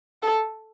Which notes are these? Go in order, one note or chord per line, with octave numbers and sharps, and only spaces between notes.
A4